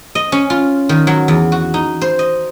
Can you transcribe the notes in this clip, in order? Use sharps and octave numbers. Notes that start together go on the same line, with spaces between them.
D#5
C#4
F4
D#3
F#3
E2
F#4
D#4
C5
D#5